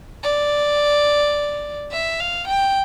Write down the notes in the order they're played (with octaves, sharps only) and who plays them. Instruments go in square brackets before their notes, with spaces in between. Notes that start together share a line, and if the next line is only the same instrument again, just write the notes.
[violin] D5
E5
F5
G5